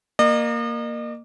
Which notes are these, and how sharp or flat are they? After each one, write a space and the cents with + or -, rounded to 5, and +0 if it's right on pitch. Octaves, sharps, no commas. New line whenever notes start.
A#3 +0 D#5 -40